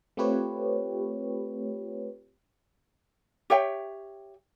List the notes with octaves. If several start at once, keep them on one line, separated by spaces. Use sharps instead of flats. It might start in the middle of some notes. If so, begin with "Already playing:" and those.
A3 C4 F4 G4 B4 C#5
G4 C#5 E5 G5